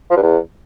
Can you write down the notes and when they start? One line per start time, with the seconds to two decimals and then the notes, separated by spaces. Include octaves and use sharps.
0.11 F3
0.16 G2
0.22 E2